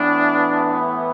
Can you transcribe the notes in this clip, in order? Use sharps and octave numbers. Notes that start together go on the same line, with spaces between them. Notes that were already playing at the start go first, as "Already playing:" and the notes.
Already playing: A2 E3 B3 D4